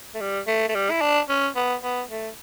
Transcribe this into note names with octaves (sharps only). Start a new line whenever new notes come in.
A3
G3
A3
A3
G3
E4
D4
C#4
B3
B3
A3